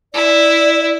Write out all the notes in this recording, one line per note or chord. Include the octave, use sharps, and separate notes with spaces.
E4 D5